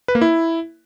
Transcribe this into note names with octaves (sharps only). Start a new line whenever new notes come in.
B4
A#3
E4